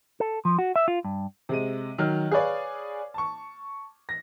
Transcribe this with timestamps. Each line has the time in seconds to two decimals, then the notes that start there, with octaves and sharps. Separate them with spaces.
0.20 A4
0.45 F3
0.59 F#4
0.76 E5
0.88 F4
1.04 G2
1.49 C3 G#3 D#7
1.98 D#3 F#3 F6
2.31 G#4 B4 C#5 D5 F5
3.14 A5 C#6
4.09 A#6